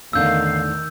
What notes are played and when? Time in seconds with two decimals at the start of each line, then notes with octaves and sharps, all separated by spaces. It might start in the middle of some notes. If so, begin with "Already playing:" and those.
0.13 E2 A2 D3 D#3 F5 E6 G6